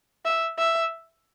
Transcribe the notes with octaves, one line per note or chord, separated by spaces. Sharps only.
E5
E5